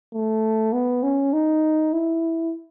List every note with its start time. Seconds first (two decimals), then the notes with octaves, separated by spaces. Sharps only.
0.13 A3
0.73 B3
1.03 C#4
1.33 D#4
1.93 E4